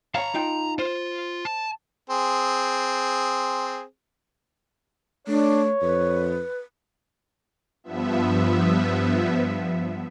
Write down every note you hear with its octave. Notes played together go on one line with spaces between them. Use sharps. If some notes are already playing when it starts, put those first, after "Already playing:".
C#5 F5 A5 A#5
D#4 F4 G5
F4 C5
A5
C4 G#4
A3 D4 C#5
F2 B4
G2 F3 B3 E5